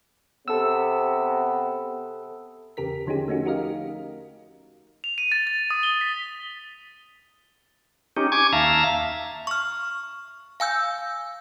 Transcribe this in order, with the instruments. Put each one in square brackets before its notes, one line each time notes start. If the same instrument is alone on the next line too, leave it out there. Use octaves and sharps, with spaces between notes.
[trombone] C3 [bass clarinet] B3 [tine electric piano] A4 E6
[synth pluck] E2 C#3 G4 A#4 B6
D3 F3 C#4 D#4 G4 G#4
A3 C#4 D#4 F#4
F#4 G4 A#4 D#5 F5
[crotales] F7
D#7
A6
A6
D#6
G7
B6
[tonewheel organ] C#4 D#4 G4
G#5 C#6 D6 G#6
D#2 E5 F5 A5 A#5
[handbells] C#6 F6
F5 G#5 E6 G6